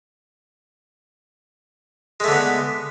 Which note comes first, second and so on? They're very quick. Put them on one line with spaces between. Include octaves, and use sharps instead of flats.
G#3 A3 D3 B3